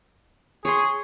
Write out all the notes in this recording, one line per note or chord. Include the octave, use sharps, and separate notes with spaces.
G#4 C#5 C6